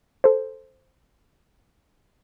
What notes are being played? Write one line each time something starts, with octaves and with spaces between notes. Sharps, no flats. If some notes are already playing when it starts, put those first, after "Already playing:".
A4 C5